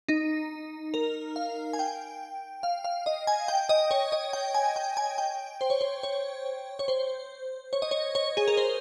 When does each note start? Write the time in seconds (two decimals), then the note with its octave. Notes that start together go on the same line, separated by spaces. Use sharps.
0.09 D#4
0.94 A#4
1.36 F5
1.73 G#5
1.79 G5
2.63 F5
2.84 F5
3.06 D#5
3.27 G#5
3.48 G5
3.69 D#5
3.91 C#5
4.12 D#5
4.33 G5
4.54 G#5
4.76 G5
4.97 G#5
5.18 G5
5.61 C5
5.70 C#5
5.81 C5
6.03 C#5
6.79 C#5
6.88 C5
7.73 C#5
7.82 D#5
7.91 C#5
8.15 C#5
8.37 G#4
8.48 A#4
8.57 C5